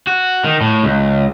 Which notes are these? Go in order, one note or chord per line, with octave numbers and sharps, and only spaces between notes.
F#4
D#3
A2
C#2